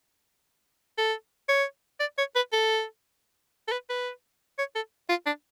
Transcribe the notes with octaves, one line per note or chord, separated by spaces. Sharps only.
A4
C#5
D5
C#5
B4
A4
A4
B4
B4
C#5
A4
F4
D4